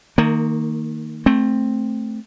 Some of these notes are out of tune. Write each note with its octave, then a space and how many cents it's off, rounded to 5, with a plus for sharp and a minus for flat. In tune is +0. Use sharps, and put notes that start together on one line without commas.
D#3 +0 A#3 -30
A3 +0 C4 +10